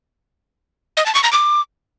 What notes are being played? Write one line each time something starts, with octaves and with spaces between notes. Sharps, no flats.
D#5
A5
C#6
A#5
D6